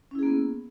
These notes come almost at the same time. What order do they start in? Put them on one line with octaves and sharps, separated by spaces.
C#4 E4 G#4 A#3 B3